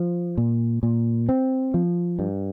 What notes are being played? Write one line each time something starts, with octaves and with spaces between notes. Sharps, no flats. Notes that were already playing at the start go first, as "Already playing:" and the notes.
Already playing: F3
A#2
A#2
C4
F3
G2